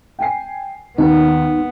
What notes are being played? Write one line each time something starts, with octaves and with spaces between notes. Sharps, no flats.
G5 G#5 C7
D#2 B3 D#4